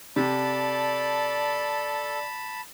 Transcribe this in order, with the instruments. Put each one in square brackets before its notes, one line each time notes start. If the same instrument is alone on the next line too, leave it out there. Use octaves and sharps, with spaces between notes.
[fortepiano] C3 [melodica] A4 [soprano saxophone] D5 [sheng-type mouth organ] A5 B5